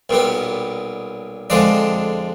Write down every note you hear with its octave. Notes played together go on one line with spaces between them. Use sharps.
B1 A#2 G3 B3
F2 D3 F3 G#3 D4 D5